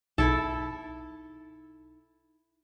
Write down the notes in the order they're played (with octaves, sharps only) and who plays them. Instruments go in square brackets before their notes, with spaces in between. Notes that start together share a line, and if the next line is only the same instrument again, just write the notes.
[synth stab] B1 [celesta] D#4 [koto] E4 A4